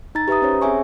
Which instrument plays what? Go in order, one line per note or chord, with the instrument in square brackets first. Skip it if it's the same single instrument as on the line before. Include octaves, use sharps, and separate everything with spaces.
[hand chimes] D#4 A#5 A6
G4 B4 E5 A#5 D#6
C#4 C5 C#5
C4 G#4 C#5 E5 G#5 C#6